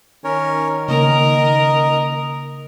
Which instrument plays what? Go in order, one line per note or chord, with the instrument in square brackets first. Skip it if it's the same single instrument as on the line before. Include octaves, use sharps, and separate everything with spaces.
[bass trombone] D#3 [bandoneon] C#4 A#4 C#5
[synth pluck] C#3 A#3 [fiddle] A#4 [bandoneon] D#5